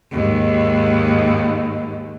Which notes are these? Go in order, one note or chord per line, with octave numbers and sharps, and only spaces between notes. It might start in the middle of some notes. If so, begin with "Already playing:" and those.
D#2 G#2